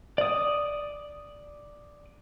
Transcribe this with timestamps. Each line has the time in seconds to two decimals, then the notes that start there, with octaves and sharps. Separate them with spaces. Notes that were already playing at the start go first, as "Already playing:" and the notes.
0.18 D5 D#6